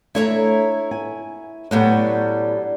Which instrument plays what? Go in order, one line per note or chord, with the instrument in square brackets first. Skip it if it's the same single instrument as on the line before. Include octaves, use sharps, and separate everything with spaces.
[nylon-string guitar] A3 D4 [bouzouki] E4 C#5 A#5
[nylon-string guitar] G#5
[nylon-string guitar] A2 B3 [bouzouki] F#3 G3 D4